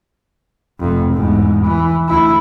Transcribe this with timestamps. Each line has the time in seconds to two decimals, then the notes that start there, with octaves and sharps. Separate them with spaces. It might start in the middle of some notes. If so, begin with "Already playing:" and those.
0.80 F1 F2
1.14 E2 G#2
1.66 E3
2.08 D2 E4